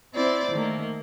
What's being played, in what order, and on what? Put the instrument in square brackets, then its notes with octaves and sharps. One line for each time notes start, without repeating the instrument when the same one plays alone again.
[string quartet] C4 E4 C5 D5
D#3 A3 A#3